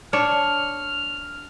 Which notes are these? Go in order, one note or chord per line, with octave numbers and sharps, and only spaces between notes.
D4 C#5 F6